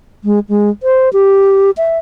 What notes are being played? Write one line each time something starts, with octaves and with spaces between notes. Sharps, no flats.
G#3
G#3
C5
G4
E5